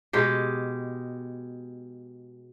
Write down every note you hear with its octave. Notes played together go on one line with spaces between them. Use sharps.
B2 G#3 G4